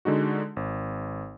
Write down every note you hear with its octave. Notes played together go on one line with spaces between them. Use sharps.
D3 G#3 D#4 F#4
G#1